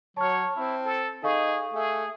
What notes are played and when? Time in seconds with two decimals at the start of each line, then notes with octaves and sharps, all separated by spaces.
0.17 F#3 C#5 A5 F6
0.56 C4 E4
0.85 A4
1.23 D#4 G#4 A4 F5 C#6
1.73 A3 G#4